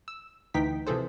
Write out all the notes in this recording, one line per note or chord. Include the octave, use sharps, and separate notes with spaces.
E6
D2 E3 D#4 G5 B6
C3 E3 F3 G#4 A4 C5